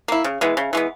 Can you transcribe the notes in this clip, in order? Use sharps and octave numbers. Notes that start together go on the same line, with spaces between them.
A#3 E4
C#3
E3 G#3 B3
C#3
E3 G#3 B3